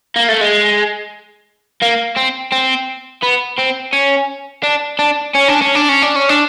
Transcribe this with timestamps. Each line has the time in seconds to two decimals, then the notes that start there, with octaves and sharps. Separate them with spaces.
0.16 A#3
0.29 A3
0.41 G#3
1.82 A#3
2.16 C4
2.52 C4
3.22 B3
3.58 C4
3.93 C#4
4.64 D4
4.99 D4
5.35 C#4
5.48 D4
5.62 C#4
5.75 D4
5.89 C#4
6.02 D4
6.16 C#4
6.29 D4